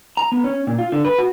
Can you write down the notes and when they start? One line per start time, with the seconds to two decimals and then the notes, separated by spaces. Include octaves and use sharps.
0.17 A#5
0.32 B3
0.44 C#4
0.67 A#2
0.79 F4
0.92 D3
1.05 B4
1.18 F#4